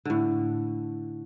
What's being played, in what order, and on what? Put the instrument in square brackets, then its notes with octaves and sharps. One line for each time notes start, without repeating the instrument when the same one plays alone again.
[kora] A2 D3